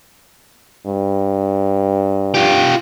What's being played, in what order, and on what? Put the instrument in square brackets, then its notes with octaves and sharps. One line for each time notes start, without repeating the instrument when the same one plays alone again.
[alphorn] G2
[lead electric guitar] F4 G4